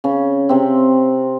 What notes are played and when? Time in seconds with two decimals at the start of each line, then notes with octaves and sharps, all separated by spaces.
0.04 C#3 C#4
0.49 C3 C4